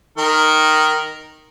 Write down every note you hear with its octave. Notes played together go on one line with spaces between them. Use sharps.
D#3 A#4